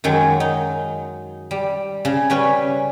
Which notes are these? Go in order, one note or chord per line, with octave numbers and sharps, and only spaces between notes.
F#2 D#3 F#3 G#3
D#4
G3
C#3
G3 C#4 B4